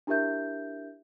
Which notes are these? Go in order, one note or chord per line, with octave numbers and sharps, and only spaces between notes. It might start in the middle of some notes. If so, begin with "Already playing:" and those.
D4 E4 G4 A#4 E5 G6